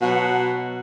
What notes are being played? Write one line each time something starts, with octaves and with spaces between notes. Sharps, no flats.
B2 F#3 F#5